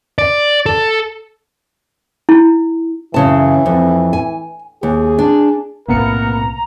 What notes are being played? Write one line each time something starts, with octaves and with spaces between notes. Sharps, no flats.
D5
A4
E4
F#2 C#3 E3 A5
F2
G#5
D#2 G#4
D4
B1 A2 C3 A#3 B3 A#4 A#5 C#7